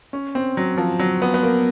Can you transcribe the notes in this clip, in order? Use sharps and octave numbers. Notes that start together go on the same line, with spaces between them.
C#4
C4
F#3
F3
F#3
B3
B3
A#3